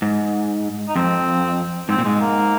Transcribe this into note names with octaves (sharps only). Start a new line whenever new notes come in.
G#2
D#4
F2 C4
G#2 C4
A#2
G#2 G#3
A#3